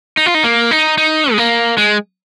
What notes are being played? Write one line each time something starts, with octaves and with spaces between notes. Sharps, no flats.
D#4
F4
D#4
A#3
D#4
D#4
G#3
A#3
G#3